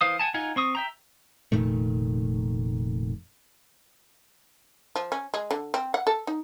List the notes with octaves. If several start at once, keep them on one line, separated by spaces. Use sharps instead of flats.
E3 C5 F5 D#6
F#5 G#5 A5
D#4 F4 F#5 G#5
C4 C#6 D#6
E5 G5 A#5
F1 A#2 D#3 A3
F3
C#4
G#3
D3
C4
F#5
A4
D#4